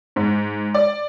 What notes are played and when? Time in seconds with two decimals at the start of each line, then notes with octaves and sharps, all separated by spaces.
0.16 G#2
0.74 D5